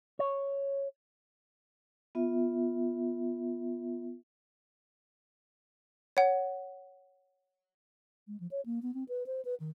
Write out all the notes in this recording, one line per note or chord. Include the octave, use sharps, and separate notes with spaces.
C#5
B3 F4 E5
C#5 F#5
G#3
F3
C#5
A#3
B3
C4
B4
C5
B4
D#3